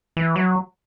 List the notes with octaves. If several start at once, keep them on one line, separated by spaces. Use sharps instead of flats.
E3
F#3